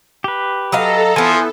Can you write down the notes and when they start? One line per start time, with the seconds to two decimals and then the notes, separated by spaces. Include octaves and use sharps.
0.24 G4 B4
0.72 F#3 A4 D#5 F5 A#5
1.16 E3 F3 B3 G#5